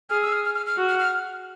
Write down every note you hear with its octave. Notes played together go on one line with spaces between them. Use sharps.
G#4 F6
E6
F6
F6
F6
F6
F#4
F6
F6